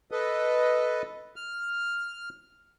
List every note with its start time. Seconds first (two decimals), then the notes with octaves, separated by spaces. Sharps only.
0.11 A4 B4 D#5
1.36 F6